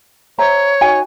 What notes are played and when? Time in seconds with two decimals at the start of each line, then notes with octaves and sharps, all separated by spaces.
0.38 C5 C#5 E5 A#5
0.81 D#4 F#4 G#5